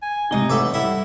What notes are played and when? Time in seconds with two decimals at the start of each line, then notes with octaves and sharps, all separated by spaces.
0.02 G#5
0.31 F#1 A2 C3 G#3 D#4 D#5 G7
0.50 A1 G2 A4 E5 F#5 D6
0.74 G3 E4 A4 F#5